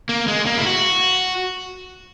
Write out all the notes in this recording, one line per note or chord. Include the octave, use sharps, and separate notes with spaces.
A#3
G#3
A#3
E4
F#4